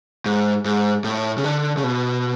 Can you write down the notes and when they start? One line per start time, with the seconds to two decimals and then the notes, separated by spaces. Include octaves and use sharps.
0.26 G#2
0.65 G#2
1.04 A2
1.38 C#3
1.44 D3
1.77 C#3
1.83 B2